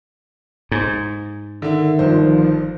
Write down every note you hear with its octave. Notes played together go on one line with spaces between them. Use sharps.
G#2
D3 D#3 E5
G1 F3 C5